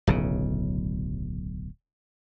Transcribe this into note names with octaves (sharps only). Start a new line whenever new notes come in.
D1 B1 C#3